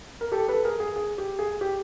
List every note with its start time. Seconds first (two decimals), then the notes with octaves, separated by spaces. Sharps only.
0.21 A#4
0.32 G4 A4
0.48 A4 B4
0.65 G#4 A#4
0.80 G#4
0.96 G#4
1.18 G4
1.39 G#4
1.61 G4